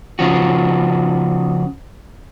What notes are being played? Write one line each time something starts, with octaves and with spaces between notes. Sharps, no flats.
C#3 F3 F#4